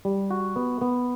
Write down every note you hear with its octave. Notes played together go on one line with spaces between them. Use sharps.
G3
F#4
B3
B3